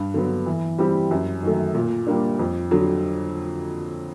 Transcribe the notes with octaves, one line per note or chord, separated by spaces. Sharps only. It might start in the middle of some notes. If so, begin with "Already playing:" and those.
Already playing: G2
D3 F#3 B3
E3
G3 C4 E4 G4
F#2
D#3 F#3 A3
A#2
G3 A#3 D4
F2
D3 F#3